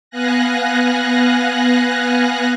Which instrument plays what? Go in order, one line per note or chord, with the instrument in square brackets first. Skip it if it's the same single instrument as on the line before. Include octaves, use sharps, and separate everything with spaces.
[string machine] B3 F5 G#5 F#6 A#6